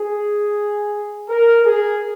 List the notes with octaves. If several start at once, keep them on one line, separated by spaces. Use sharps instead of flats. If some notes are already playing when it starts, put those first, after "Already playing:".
Already playing: G#4
A#4
G#4